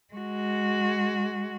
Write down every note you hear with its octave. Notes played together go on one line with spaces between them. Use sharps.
G#3 F#4